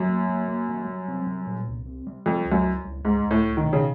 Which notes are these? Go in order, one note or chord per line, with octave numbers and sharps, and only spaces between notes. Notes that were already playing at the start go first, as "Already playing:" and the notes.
Already playing: F#2
A#3
A#3
A#3
G3
G3
C4
G3
A#2
C2
C4
G3
F2 C4
C#2
F#2
G3
C#2
C#2 G#2
C#2
A2
C#2
D#3
B2
C#3